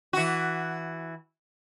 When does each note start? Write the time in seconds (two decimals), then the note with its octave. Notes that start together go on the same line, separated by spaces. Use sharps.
0.13 E3 F#4